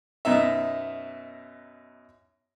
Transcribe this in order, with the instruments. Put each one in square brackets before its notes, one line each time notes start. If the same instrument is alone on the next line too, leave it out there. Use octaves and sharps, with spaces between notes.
[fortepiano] F#2 B2 D#4 E5